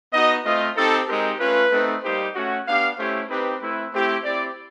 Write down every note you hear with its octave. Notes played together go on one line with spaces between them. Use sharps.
B3 D#4 F#4 D#5
A3 C4 F4 D#5
C4 D#4 G4 A4
G#3 C4 D#4 G4 A#4
A3 C#4 F4 B4
A3 C4 D#4
G3 A#3 D#4 G4 C5
A3 C#4 F#4
B3 D4 G4 F5
A3 C#4 E4 G4 C5
C4 D#4 G4 B4
A3 C4 E4 B4
A3 C4 E4 G4
C4 E4 G4 D5